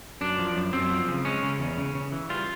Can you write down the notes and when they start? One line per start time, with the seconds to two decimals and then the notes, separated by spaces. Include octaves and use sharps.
0.21 F#2 D4
0.38 F3
0.56 F#2
0.73 F#2 C4
0.90 F3
1.08 C#3
1.25 G#3 C#4
1.43 C#3
1.60 E2
1.78 C#3
1.95 C#3
2.12 E3
2.29 G3 F4